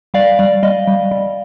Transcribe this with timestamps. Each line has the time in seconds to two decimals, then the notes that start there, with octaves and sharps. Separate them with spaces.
0.14 G3 D5 F5
0.39 G3 D5
0.63 G3 D#5
0.87 G3
1.11 G3